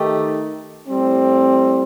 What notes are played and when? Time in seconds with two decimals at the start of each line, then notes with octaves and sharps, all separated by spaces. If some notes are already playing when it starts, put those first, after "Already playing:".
Already playing: D#3 A3 D#4 G4
0.87 A2 G3 C4